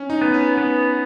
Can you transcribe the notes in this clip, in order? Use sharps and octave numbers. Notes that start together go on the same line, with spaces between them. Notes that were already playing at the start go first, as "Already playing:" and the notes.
Already playing: C#4
D#4
B3
C#4
B3